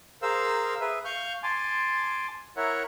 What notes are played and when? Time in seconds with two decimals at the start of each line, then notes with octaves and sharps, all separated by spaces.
0.22 G#4 A#4 C5 F5 E6
0.81 G#4 B4 E5
1.05 F5 C#6 F6 G6
1.43 G#5 A5 C6 D6
2.57 E4 A#4 C#5 E5 F#5